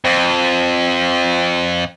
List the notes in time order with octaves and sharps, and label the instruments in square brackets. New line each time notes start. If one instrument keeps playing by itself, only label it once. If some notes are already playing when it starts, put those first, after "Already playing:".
[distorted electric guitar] F2 [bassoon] C4